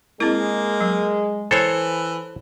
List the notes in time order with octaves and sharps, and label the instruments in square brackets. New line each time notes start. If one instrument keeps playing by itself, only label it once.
[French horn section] G#3 [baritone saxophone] A#3 [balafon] C4 E4
[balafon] F#3
[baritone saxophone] E3 [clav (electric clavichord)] A4 C5 C#5